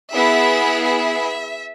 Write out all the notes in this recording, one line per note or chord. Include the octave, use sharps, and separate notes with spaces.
B3 E4 G#4 E5
E5